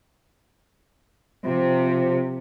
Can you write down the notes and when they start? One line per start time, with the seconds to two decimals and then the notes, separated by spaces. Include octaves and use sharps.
1.45 C3 F3